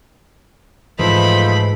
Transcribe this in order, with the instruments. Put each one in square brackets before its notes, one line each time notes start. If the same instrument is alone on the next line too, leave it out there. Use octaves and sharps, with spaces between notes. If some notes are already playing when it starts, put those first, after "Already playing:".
[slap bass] G#2 E3 [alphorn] F3 [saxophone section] A3 D#4 C5 [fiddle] B5